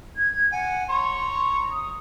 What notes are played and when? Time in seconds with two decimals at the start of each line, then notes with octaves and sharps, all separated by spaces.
0.16 G#6
0.52 F#5 G#5
0.89 C#5 A#5 C6 C#6
1.71 D#6